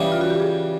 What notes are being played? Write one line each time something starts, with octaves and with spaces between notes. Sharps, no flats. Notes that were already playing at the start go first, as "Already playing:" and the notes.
Already playing: C#3 E3 G3 G4
F4
F#4
G4
G#4